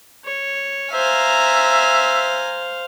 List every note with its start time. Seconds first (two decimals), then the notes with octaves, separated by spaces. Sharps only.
0.25 C#5
0.93 C5 E5 F5 G#5 A#5